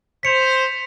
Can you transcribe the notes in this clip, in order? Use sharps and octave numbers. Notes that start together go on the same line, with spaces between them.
C5 B6 C#7 F7